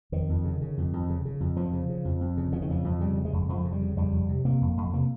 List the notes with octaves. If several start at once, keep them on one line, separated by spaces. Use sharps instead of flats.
F2 D#3
F2
C#3
C#3
F2
F2
C#3
C#3
F2
F2 F3
C#3
C#3
F2
F2
C#3
C#3 F3
D#3
F2 F3
F2
C#3 G3
C#3
G#3
F2
F2 F3
C#3
G3
C#3
F2 G3
F2
C3
C3 A#3
F2
F2
C3 A#3